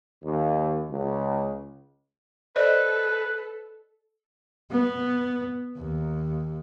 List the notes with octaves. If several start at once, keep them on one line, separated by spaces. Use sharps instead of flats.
D#2
C#2
A4 B4 C5 D5 D#5
B3
D#2